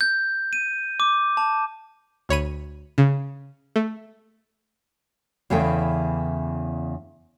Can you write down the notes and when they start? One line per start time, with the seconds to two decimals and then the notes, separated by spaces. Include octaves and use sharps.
0.01 G6
0.53 D#7
1.00 D6
1.37 A5
2.29 D2 C#5 B5 D#7
2.98 C#3
3.76 A3
5.50 E2 C#3 E3 A3 G5